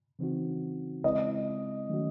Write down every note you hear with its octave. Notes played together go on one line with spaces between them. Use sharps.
C#3 E3 C4 D#4 F#4
C#3 G#3 C4 E4 D#5
D#3 F#3 A3 C#4 F#4